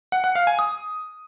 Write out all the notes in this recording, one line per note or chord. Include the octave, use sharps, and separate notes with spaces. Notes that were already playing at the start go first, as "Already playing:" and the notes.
F#5
F#5
F5
G#5
D#6